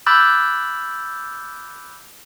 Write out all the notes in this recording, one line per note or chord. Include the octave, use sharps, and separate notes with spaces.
B5 D6 E6 F#6 G6 A6